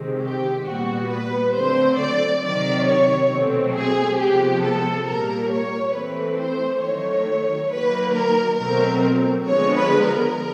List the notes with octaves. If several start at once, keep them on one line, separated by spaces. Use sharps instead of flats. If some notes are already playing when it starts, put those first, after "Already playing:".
Already playing: C3 D#3 G#3 C4
G4
A#2 G3 B3 F#4
B4
D3 F#3 A3 C4 C5
D5
C3 D#3 F#3 D5
C#5
B2 F#3 A3 C4
G#4
C3 F3 G#3 B3 G4
A4
A#2 G3 A#3 A#4
C#5
E3 A3 C4 B4
C5
D#3 F#3 A3 C#5
D#3 F#3 A#3 B4
A#4
B2 F#3 A3 C4 A#4
D3 F3 G#3 B3 C#5
B4
A#4